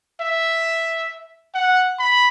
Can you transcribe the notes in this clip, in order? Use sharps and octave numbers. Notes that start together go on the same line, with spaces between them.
E5
F#5
B5